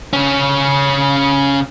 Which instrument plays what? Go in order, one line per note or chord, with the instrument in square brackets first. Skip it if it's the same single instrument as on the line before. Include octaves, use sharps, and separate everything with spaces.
[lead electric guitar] C#3 C#4